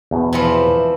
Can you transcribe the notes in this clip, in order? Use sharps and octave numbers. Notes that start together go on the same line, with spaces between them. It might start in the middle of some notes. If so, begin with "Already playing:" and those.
E2 B2
C3 E3 F3